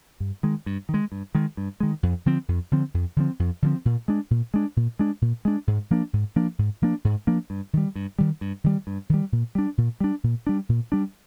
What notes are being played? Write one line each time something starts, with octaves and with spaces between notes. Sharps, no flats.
G2
D#3 G#3
G2
D#3
G#3
G2
D#3 G#3
G2
D#3 G#3
F2
D3 F3 C4
F2
D3 F3 C4
F2
D3 F3 C4
F2
D3 F3 C4
A#2
G#3 D4
A#2
G#3 D4
A#2
G#3 D4
A#2
G#3 D4
G#2
F3 A#3 D4
G#2
F3 A#3 D4
G#2
F3 A#3 D4
G#2
F3 A#3 D4
G2
D#3 G3
G2
D#3 G3
G2
D#3 G3
G2
D#3 G3
A#2
G3 D4
A#2
G3 D4
A#2
G3 D4
A#2
G3 D4